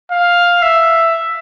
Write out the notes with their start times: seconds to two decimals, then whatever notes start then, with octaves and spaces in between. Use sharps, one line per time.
0.12 F5
0.63 E5